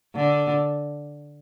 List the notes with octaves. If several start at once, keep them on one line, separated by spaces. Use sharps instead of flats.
D3